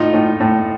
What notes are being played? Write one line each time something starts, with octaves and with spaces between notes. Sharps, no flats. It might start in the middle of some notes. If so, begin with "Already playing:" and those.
Already playing: A2 D#4 F4
A2
A2